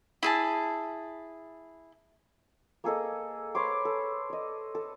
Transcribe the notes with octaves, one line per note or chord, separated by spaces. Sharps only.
E4 G#4 A5
A#3 G#4 A4 D#5
B4 C#5 C6 D6
A4
D5 D#5
A4